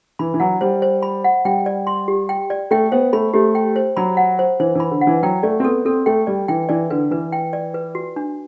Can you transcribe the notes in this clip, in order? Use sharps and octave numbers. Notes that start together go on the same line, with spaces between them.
E3 B5
E3
F#3 F#5
G3 C5
C5
B5
F#5
G3 G5
D5
C6
G4
G5
D5
A3 G5
B3 C5
A3 B5
A3 G4
G5
C5
F#3 B5
F#5
C5
E3 C5
E3 B5
D3
F#5
E3
F#3 G5
A3 D5
C4
B3 A4
C4 A4
A3 G5
G3 D5
E3 G5
E3 D5
D3 B4
E3 B4
G5
D5
B4
F#4
D4